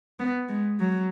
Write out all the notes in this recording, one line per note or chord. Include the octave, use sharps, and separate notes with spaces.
B3
G#3
F#3